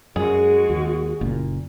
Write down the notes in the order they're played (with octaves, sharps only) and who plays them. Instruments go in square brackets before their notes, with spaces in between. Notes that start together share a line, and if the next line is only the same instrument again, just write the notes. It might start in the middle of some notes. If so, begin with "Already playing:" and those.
[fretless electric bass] F#2 [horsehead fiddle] G#3 F#4 [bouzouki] G#4
[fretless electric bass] D#2
F#1 A#2